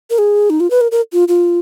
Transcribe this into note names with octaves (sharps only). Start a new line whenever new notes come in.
A#4
G#4
D#4
F4
B4
A#4
A#4
F4
F4